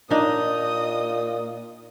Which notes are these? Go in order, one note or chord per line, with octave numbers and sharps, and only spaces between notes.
A#2 D4 D#4 D#5 D#6